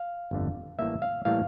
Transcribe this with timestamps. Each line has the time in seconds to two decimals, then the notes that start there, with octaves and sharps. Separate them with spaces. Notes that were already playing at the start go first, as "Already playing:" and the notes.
Already playing: F5
0.31 G1 F2 D3 A3
0.79 A1 A2 G3 A#3 E5
1.02 F5
1.25 A2 E3 G3 A#3 F5